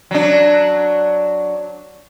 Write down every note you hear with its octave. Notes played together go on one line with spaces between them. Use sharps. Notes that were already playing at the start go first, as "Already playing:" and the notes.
F#3 D4